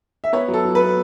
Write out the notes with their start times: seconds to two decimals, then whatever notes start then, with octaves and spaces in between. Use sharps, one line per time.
0.24 E5
0.33 B3 C#5
0.48 F#3
0.54 A4
0.65 F#3
0.75 B4
0.80 B3